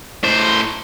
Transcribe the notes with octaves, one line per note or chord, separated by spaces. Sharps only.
A2 C5